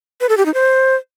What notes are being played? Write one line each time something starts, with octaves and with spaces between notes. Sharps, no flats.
B4
A4
G4
D#4
C5